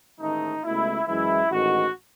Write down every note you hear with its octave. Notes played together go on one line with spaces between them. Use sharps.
A1 G#2 D#3 A3 D#4
C#2 B2 A3 E4
F#2 E3 G#3 E4
A1 G#2 D#3 F#4